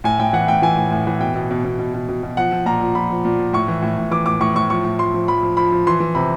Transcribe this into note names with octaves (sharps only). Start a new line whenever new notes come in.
A2 G#5
A2 G5
E3 F#5
A2 G5
E3 G#5
A2
A2
E3
B2 G5
B2
B2
B2
B2
B2
B2
B2
F3 F#5
F3
A#2 A#5
F3
F3 B5
F3
A#2
F3
A2 C#6
E3
A2
A2
E3 D6
A2 D6
A2 C#6
A2 C#6
F3 C#6
A2
F3 C6
F3
F3 B5
F3
F3 B5
F3
E3 C6
E3
C3 B5